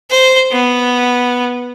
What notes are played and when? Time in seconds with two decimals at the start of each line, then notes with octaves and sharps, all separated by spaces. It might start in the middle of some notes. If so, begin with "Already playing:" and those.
0.10 C5
0.52 B3